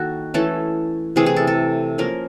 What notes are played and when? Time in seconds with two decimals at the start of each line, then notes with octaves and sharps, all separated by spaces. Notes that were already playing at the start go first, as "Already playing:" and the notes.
Already playing: D#3 A#3 F#4 A4
0.34 E3 A3 C#4 A4
1.16 C3 E3 A3 G#4
1.26 G#4
1.36 A4
1.47 A4
1.98 F3 A#3 C#4 A#4